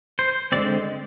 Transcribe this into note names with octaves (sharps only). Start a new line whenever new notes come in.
C5
D3 F3 G#3 C4 D5